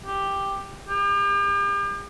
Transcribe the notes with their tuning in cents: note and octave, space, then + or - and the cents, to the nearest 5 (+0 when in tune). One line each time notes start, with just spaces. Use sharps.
G4 +5
G4 +40